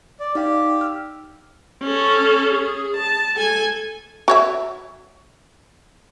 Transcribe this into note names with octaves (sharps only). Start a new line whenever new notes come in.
D5
D#4 G4 D5 F5
E6 F6
C#4 A4
G#4
A5
A4 G#5
F#4 C#5 E5